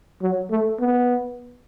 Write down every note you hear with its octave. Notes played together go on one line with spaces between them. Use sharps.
F#3
A3
B3